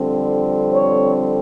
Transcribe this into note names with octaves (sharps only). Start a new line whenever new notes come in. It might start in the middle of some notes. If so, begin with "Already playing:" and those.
Already playing: F2 D3 G3 C4
C#5